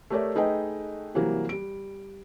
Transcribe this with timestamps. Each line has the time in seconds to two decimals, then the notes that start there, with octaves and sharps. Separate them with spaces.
0.10 A3 G4 A#4 C#5 D5 E5
0.35 A3 D#4 G#4 B4 D#5 G5
1.15 C3 E3 F#3 G3 A#3
1.49 G3 D7